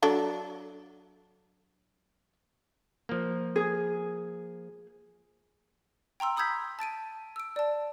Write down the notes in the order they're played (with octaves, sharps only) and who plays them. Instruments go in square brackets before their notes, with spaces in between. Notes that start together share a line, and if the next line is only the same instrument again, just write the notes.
[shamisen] F#3 D4 A4
[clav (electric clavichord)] F3 A#3
[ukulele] G#4
[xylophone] G5 A#5 C6 E6
B5 D#6 E6 G6 G#6 B6
A5 A6 D7 D#7
E6 D7
D5 A5